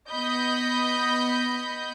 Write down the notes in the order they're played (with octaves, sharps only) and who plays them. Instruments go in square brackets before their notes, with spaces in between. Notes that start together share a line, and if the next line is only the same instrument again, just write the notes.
[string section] B3 D#5 B5 G6